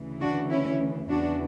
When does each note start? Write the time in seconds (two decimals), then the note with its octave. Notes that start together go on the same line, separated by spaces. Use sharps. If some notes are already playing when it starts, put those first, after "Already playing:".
Already playing: D2 C#3 E3
0.20 D4 F#4
0.50 C#4 E4
1.09 E2 C#3 E3 D4 F#4